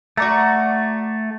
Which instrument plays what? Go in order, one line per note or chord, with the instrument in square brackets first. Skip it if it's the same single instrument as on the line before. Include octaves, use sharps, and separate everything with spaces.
[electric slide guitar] A3 [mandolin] F#4 D5 A#5